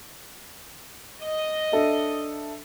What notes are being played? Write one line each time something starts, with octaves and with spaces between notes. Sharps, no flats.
D#5
D4 A4 E5